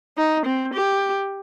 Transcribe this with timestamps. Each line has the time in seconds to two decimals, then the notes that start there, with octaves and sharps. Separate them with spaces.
0.17 D#4
0.46 C4
0.73 G4